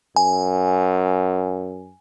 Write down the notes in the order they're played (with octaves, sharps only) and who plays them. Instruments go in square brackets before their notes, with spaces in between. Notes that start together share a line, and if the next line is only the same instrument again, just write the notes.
[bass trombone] F#2 [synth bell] G#5